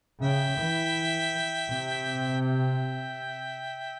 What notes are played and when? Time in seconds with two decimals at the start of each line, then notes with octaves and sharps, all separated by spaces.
0.22 C#3 E5 G5
0.59 E3
1.68 C3
2.41 E5 G5